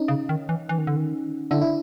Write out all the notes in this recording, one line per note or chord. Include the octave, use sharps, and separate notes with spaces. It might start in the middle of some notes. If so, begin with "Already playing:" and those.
Already playing: C#4 D#4
C#3
D#3
E3
E3
D#3
D3
D#3
D3 D4 E4
E4